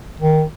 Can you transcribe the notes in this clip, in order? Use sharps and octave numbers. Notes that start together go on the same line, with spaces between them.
D#3